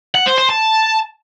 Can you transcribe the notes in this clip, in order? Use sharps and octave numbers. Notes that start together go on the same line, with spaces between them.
F#5
C5
C5
A5